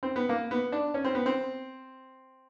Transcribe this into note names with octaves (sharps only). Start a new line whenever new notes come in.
C4
B3
A#3
B3
D4
C#4
C4
B3
C4